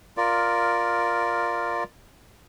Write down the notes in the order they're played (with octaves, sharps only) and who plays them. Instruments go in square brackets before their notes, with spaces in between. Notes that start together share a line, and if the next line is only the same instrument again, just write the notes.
[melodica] F4 A#4 D5